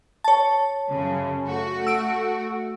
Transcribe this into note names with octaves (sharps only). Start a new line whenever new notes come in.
C#5 A5
F#2 C#3
A3 F#4
E6 D7